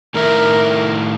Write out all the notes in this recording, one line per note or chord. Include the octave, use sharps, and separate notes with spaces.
A2 D#3 E4 A#4